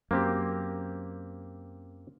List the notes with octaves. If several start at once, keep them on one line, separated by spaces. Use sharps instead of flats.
F#2 A#3 C4 G4